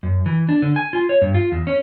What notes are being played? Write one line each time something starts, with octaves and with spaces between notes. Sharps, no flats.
F#2
E3
D4
D3
G#5
F4
C#5
G2
F4
E2
C#4